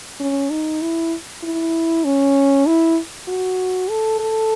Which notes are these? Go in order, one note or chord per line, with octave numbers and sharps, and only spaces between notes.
C#4
D#4
E4
E4
C#4
E4
F#4
A4
A4